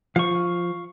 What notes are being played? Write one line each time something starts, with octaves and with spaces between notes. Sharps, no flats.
F3 F5 C#6